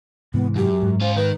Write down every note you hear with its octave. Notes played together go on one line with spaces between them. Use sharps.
G#2 C3 E3 B3
F#2 G4
G#2
C#4 F4 C5
D#3 B4